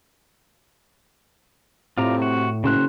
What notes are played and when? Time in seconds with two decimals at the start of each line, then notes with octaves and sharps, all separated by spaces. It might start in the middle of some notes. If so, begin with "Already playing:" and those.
1.98 A2 C3 F4 D5 A#5
2.22 F#4
2.64 F#1 C#3 C5 F#6